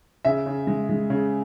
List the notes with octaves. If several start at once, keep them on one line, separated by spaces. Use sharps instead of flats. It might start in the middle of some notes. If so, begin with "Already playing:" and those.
C#3 E5
C#3
G#3
G#3
C#3